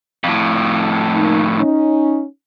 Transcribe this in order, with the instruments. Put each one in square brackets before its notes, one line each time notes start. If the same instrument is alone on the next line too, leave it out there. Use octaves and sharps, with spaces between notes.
[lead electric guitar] F2 A2
[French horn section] A#3 D#4
C#4 D#4